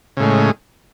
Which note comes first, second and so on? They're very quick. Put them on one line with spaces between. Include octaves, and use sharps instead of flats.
C#3 A2 G#3